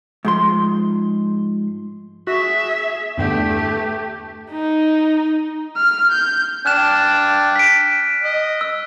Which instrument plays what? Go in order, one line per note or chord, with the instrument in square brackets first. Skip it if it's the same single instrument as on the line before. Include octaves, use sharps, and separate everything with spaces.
[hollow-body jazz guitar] G#2 F3 C6
[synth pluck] F#4 [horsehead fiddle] G#4 E5
[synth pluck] E2 G2 D3 [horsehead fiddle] A3 G4
[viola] D#4
[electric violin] F6
G6
[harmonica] D4 G5 A5 [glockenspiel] F6 F#6 E7
[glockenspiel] B6 D7
[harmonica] D#5
[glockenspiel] E6